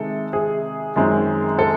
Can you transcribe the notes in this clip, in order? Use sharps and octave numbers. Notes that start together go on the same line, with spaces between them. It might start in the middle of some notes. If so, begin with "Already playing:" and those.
Already playing: C3 D#3 G#3 A4
G#4
F#2 D#3 G#3 C4
A4